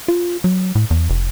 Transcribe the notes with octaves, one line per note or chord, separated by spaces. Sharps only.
F4
F#3
A2
E2
F1